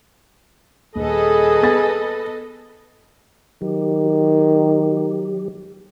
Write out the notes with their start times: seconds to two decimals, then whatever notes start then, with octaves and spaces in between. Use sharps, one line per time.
0.95 D#1 G#4 A4 B4 D#5
1.62 B3 A6
3.62 D#3 F#3 G4